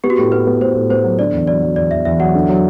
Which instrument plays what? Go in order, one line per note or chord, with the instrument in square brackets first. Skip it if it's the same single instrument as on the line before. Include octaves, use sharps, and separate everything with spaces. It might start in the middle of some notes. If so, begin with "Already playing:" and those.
[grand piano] B3 [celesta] G4
[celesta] F#4
[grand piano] A2 [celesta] G4
[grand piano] B3 [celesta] B4
[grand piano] B3
[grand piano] A2 [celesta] C5
[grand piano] A2
[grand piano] B3 [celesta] C5
[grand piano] F#3
[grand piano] D3 [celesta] D5
[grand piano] E2
[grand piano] F#3 [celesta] D5
[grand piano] F#3
[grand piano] E2 [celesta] D5
[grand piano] E2 [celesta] E5
[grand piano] E2 [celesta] E5
[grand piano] F#3 [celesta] F#5
[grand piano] D3
F#3